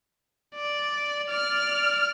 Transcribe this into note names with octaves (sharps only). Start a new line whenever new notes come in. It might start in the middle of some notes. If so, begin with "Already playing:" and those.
D5
D5 F6